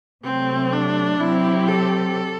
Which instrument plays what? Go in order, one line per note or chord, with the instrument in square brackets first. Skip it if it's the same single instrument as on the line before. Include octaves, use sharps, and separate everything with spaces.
[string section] C3 F#3 A3 [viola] C4
[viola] D4
[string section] C3 F#3 C4 G4 [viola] E4
[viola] A4